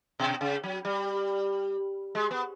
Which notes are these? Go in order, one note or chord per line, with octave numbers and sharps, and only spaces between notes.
B2
C#3
F#3
G3
G#3
B3